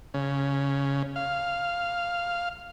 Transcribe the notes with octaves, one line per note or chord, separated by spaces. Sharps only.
C#3
F5